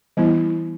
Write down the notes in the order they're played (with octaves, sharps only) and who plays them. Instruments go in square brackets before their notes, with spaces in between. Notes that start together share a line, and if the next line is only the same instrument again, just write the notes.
[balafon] E3 G3 B3 E4